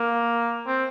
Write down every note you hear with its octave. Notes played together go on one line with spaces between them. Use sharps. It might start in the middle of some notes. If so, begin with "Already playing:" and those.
Already playing: A#3
C4